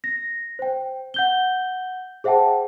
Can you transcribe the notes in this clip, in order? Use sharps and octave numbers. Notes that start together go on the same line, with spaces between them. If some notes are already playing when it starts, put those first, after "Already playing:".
A#6
C5 G5
F#5 G6 G7
G#4 C5 E5 F#5 G5 A5